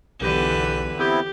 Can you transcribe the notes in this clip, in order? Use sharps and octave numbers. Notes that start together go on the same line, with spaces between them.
B1 E2 D3 G4 B4
B3 C4 E4 G4